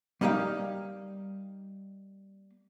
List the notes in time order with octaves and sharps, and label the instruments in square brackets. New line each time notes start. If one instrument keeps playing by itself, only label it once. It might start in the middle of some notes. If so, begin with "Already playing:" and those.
[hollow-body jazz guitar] G3 A#3 D#4 G4 F5